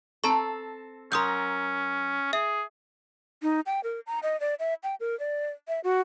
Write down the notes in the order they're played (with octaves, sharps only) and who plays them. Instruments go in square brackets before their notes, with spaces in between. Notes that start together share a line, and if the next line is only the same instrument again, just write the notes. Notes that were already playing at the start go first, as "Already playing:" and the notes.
[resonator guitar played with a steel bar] C4 A4 [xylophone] A5 A#5 C#6
[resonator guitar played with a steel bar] F#3 A#4 [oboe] C#4 [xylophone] C6 D#6 G6
[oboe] G#4 [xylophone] E5
[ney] D#4
G5
A#4
A#5
D#5
D5
E5
G5
A#4
D5
E5
F#4